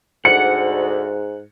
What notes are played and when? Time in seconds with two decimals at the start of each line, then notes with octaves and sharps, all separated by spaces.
0.25 D2 G#2 F#5 C#7